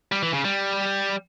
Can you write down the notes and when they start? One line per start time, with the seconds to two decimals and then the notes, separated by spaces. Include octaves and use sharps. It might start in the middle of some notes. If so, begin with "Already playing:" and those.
0.12 G3
0.23 E3
0.33 C#3
0.45 G3